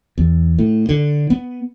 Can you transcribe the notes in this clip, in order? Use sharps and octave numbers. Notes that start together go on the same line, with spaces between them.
E2
A2
D3
B3